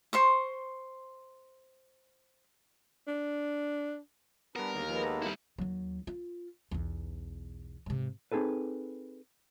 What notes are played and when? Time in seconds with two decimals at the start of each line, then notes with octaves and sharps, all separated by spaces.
0.13 C5 C6 C#6
3.07 D4
4.56 G3 B3 D4 A#4 B4
4.73 D#2 D3 G#3
4.89 F3 G#3 A#3 B3
5.04 A4 A#5
5.22 G3 E4
5.58 D#2 F#3
6.07 F4
6.71 B1 E2
7.86 G#2 C3
8.32 C4 D#4 G#4 A4 B4